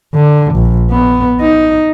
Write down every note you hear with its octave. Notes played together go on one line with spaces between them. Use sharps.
D3
A#1
B3
D#4